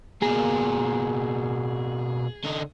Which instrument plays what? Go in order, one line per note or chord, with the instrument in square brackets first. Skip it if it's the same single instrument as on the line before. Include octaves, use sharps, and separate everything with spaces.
[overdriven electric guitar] B2 A#3 [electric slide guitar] G#4
[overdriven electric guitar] D3 D#4